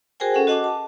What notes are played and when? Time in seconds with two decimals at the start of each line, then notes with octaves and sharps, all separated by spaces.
0.20 F#4 G#4 A#4 C5 G5 G#5
0.34 C#4 A4 F#5
0.47 F#4 D#5 F#5 A5 D6
0.64 A5